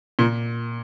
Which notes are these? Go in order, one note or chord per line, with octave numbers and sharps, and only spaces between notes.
A#2